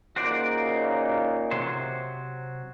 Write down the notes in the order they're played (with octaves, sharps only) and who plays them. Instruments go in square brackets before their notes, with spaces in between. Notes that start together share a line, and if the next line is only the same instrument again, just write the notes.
[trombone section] A#2 C#3 D#4 [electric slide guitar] F#4 C5 D5
[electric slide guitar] C3 F#3 C5